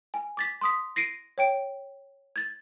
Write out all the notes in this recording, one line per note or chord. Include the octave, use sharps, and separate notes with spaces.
G#5
D6 A6 B6
C6 D#6 B6
A#6 C7 D7 D#7
C#5 G5 D7
G#6 A6